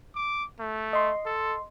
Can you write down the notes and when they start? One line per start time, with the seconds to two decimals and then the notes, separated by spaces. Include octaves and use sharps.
0.15 D6
0.60 A3
0.93 D#5 C6
1.26 A4